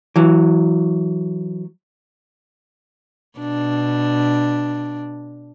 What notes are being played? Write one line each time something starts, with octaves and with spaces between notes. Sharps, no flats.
E3 F#3
B2 D4